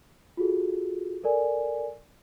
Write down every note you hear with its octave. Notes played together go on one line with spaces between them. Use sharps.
F4 F#4 G#4 A4
A4 A#4 D5 G#5